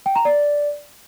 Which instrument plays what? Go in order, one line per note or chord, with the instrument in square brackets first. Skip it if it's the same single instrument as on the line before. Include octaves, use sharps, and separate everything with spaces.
[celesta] G5
A#5
D5